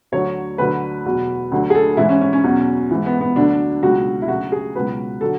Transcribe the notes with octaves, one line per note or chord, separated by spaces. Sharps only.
D2 D3 F#3 C#5
D2 D3 F#3 B4
E2 B2 F#3
D2 D3 F#3
G#4
A4
G#2 E3 E4
C#4
C#4
C#4
E2 B2 F#3
G#2 E3
B3
B3
D2 D3 F#3 D4
C#2 B2 F#3 F#4
E4
D2 C#3 F#3 F#4
G#4
C#2 B2 F#3 B4
D3 F#3 A4